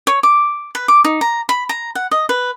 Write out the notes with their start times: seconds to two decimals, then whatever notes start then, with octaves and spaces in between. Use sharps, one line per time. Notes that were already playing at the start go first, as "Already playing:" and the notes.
0.07 C#5
0.23 D6
0.75 B4
0.88 D6
1.05 D#4
1.21 A#5
1.49 B5
1.69 A#5
1.95 F#5
2.11 D#5
2.29 B4